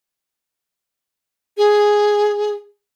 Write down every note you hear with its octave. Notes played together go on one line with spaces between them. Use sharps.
G#4